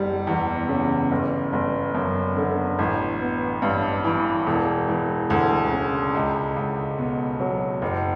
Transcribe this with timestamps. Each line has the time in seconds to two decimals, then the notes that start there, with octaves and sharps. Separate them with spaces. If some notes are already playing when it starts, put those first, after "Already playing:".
Already playing: F#1 G3
0.27 E2
0.69 C#3
1.11 G1
1.53 G1
1.95 F#2
2.37 D3
2.79 A1
3.21 B3
3.62 G2
4.04 E3
4.47 E1
4.88 E3
5.30 D2
5.72 C#3
6.15 C#2
6.56 C#2
6.98 B2
7.40 F#3
7.82 F#1